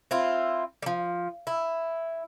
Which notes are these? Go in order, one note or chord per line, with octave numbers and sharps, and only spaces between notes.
C4 E4 F4
F3 G3
E4